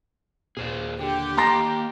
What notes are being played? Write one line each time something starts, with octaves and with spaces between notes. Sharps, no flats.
D#1 A#2 G#4 C5 D5
D3 G4
A#3 D#5 A#5 C6 A#6